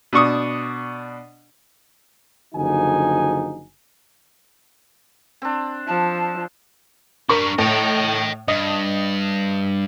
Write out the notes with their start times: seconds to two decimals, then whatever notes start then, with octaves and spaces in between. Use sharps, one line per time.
0.13 B2 D4 C#6 D#6
2.55 F#1 D3 F3 D#4 F#4 G#5
5.42 C4 D4
5.88 F3 A5
7.29 D4 A#4 B4 C#6
7.58 A2 D#5 G5
8.48 G2 D#5